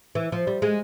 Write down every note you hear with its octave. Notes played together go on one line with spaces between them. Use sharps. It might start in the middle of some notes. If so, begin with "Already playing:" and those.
E3
F3
G3
G#3